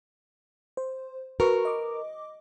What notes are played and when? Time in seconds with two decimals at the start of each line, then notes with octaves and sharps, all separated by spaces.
0.77 C5
1.40 F#4 A#4 B4 C#6
1.65 D#5 D6